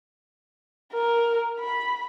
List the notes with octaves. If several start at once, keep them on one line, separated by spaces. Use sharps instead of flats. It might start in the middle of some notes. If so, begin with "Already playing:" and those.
A#4
B5